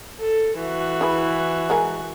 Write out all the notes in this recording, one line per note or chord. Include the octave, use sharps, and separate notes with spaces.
A4
E3 F#4
E4 G#4 B4
G#3 A#4 G#5